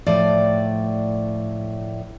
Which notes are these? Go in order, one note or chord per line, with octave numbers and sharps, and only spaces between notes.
A2 F3 D5